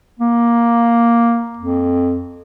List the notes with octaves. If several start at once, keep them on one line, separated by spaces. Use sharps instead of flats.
A#3
F2